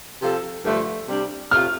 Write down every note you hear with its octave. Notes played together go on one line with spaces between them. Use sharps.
C3 F3 C4 A4
G2 D3 F3 A3
C3 G3 D4
C3 A3 F4 F6